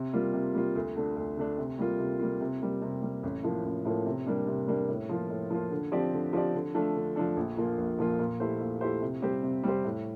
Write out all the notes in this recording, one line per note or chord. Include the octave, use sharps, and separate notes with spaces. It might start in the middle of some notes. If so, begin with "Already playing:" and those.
Already playing: C3
G3 A#3 F4
C3
G3 A#3 F4
D2
D3 A3 D4
D2
D3 A3 D4
C3
G3 A#3 F4
C3
G3 A#3 F4
C3
G3 A#3
C3
G3 A#3
A1
A2 F3 A#3
A1
A2 F3 A#3
C3
G3 A#3 D4
C3
G3 A#3 D4
A2
F3 A#3 F4
A2
F3 A#3 F4
D3
F3 C4 G4 D5
D3
F3 C4 G4 D5
D3
F3 A3 D4 A4
D3
F3 A3 D4 A4
A#1
A#2 F3 A#3 F4
A#1
A#2 F3 A#3 F4
A#2
A3 E4 G4 C5
A#2
A3 E4 G4 C5
C3
G3 C4 G4 C5
C3
G3 C4 G4 C5
A2